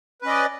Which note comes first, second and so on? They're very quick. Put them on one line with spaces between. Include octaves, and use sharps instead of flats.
B4 C#4 D#5 D5